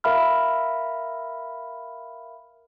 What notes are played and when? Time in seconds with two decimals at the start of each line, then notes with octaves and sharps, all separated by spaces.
0.04 A#4 E5 F5 B5 F6